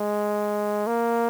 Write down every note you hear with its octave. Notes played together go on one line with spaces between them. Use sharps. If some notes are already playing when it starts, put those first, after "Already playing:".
Already playing: G#3
A#3